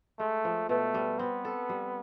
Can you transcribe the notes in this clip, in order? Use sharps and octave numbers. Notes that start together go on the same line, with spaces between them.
G#3 A3
F3
B2 A3
G3
B3 C4
A4
G3